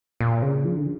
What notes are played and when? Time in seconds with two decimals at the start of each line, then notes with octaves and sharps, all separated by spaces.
0.21 A#2
0.42 C#3
0.65 F3
0.77 D3